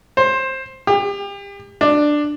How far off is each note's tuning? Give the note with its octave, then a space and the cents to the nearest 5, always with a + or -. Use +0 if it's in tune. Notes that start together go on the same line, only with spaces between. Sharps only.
C5 +15
G4 +35
D4 +10